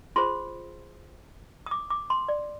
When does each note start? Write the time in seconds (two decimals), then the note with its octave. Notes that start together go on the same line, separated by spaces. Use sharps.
0.16 F4 G#4 C5 C6
1.66 D#6
1.71 D6
1.90 D6
2.10 C6
2.28 D5